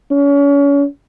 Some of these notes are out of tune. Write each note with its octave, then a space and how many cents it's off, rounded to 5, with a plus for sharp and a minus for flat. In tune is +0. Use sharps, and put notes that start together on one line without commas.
C#4 +35